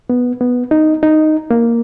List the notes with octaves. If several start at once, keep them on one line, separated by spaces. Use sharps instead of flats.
B3
B3
D#4
D#4
A#3